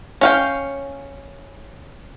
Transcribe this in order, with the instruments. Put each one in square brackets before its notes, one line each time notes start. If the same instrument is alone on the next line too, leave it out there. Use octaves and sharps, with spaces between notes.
[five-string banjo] C#4 F5 G5